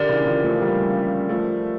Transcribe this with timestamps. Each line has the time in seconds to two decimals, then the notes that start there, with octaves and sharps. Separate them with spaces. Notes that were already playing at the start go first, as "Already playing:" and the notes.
Already playing: D3 G4 A#4 D5
0.09 C#3 E3
0.26 D3 F3
0.44 F3 A3
0.61 G3 A#3
1.29 F3 A3